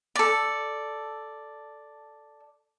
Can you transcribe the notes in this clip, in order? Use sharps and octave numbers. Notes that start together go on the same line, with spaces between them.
A4 D5